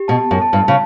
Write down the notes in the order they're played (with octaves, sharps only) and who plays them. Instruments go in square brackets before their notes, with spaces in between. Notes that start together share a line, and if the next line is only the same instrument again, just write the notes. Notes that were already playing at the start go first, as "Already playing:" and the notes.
Already playing: [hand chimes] G4
[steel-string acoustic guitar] B2 [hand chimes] A5
[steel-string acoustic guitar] F#2
[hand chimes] A5
[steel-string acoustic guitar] G2
C#3